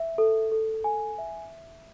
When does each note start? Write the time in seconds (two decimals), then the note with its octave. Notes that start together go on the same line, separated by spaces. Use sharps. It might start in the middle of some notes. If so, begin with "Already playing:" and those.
Already playing: E5
0.18 A4
0.52 A4
0.84 G#5
1.18 E5